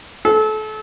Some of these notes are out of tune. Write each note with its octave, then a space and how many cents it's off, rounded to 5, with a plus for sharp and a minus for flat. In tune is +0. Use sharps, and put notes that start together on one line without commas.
A4 -30